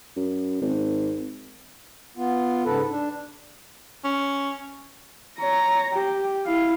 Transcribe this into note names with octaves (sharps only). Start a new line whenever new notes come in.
F#2
G#1
B3 F4
G#2 C#3 A4 B4
D4
C#4
C#5 A#5
G4
E4 F5